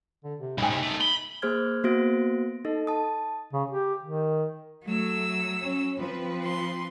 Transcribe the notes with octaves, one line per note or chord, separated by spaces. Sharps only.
D3
C3
C2 G#2 D#4 G#5 B5
A2 C3
C2 A3
B5 G7
A#3 G#4 C5 F6 G#6
A#3 B3 F#4 C5 A#6 D7
D#4 A4 D#5
A5 D#6
C#3
G4
D#3
F#3 A3 E6
C#4
F3 C4 B4
C6